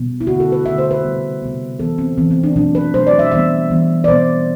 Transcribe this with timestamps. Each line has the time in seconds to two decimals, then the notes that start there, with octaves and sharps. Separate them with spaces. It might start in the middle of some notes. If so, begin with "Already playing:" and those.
Already playing: B2 G3 B3
0.21 E4
0.27 D3 A3 F#4
0.40 A4
0.52 B4
0.65 D3 A3 E5
0.78 C5
0.91 B4
1.03 C3 G3 B3
1.42 C3 G3 B3
1.79 E3 B3 A4
1.98 C4
2.18 E3 B3 C4
2.31 C4
2.43 D4
2.56 B2 F#3 A3 D4
2.75 B4
2.94 B2 F#3 A3 C5
3.07 D5
3.19 E5
3.32 E3 G3 B3 E5
3.70 E3 G3 B3
4.04 D5
4.08 B2 G3 B3 C5